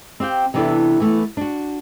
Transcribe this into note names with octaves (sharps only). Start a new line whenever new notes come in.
C4 G4 F5 G5
C3 E3 B3 D4 E4 A4
E3 A3 B3
D4 F#4